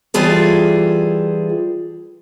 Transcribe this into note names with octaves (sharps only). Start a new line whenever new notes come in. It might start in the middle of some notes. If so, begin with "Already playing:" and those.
E3 G3 F4 G#4 A4